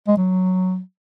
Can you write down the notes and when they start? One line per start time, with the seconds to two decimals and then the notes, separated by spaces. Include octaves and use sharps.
0.08 G#3
0.17 F#3